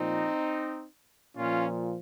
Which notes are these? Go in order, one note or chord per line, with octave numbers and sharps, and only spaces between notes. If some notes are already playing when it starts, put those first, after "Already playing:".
Already playing: A#2 F3 C4 D#4
A#2 F3 C#4 F4